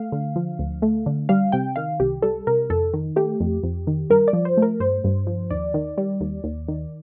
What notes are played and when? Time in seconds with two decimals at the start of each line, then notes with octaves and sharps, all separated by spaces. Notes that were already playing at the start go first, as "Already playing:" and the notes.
Already playing: A3 F5
0.12 D3
0.36 F3
0.59 D2
0.82 A3
1.06 D3
1.29 G3 F5
1.52 C3 G5
1.76 D#3 F5
2.00 C2 G4
2.22 G3 A4
2.47 C3 A#4
2.70 F2 A4
2.94 D#3
3.16 A3 G4
3.40 F2
3.63 F2
3.87 D#3
4.10 G2 A#4
4.28 D5
4.33 F3
4.45 C5
4.57 A3
4.62 A#4
4.80 G2 C5
5.04 G2
5.27 F3
5.50 D#2 D5
5.74 D#3
5.98 G3
6.20 D#2
6.44 D#2
6.68 D#3